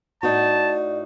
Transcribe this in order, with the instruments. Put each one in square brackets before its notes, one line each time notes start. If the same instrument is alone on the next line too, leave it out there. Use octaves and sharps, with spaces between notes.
[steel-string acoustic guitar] A2 D#4 F#4 [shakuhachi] D5 [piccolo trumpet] A5